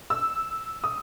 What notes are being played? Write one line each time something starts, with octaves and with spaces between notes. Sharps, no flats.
E6
D#6